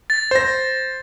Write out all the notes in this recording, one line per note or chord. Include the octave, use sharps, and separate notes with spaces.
A6
C5 A#6